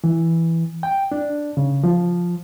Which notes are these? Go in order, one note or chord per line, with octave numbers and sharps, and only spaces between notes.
E3
G5
D4
C#3
F3